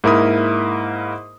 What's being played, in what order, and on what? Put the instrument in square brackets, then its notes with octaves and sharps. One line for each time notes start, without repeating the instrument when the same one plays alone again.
[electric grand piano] G#2 A#3 E4 A#4 B5 D#6